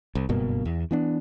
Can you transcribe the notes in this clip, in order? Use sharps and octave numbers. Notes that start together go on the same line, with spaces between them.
C2
F#1 G2 B2 A#3
E2
E3 B3 D4